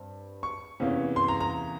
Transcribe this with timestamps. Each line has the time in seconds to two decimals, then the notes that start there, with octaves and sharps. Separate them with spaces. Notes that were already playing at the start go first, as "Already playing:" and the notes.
Already playing: G2 C4
0.43 C#6
0.80 E2 C3 E3 A#3 C#4
1.16 C6
1.28 A#5
1.40 A#5